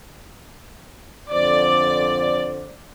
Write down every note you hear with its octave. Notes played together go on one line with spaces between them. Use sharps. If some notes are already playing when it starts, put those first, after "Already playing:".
F2 D3 C5 D5